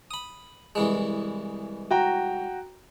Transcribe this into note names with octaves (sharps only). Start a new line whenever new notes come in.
B5 D#6
C2 E3 G#3
F#4 G5 A#5